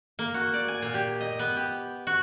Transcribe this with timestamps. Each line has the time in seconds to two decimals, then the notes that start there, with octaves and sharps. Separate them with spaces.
0.19 A#3
0.34 F#4
0.54 D5
0.68 G#5
0.82 A#2
0.94 G4
1.20 D#5
1.39 B3
1.57 G4
2.07 F#4